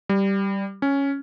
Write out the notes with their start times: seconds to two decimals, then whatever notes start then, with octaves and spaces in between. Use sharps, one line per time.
0.09 G3
0.82 C#4